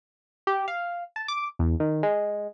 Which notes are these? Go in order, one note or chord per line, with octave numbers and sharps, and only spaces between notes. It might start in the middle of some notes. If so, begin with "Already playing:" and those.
G4
F5
A5
D6
E2
D#3
G#3